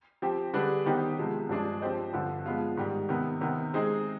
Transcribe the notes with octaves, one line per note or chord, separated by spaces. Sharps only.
F3 C4 G4
D3 G3 D4 G#4 B4
D#3 B3 D#4 G4 C5
C3 F3 G#3 B3
G2 F3 G#3 D4 G#4
F3 C4 G4 C5 D#5
G2 D3 F3 C4
F3 G#3 B3 F4
G#2 D#3 G3
C3 D#3 B3
C3 D#3 B3
G#3 C4 D#4 G#4